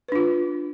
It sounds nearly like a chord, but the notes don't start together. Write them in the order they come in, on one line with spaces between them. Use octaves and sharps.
B4 D4 F4